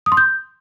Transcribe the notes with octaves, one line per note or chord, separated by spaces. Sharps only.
D#6
C6
G6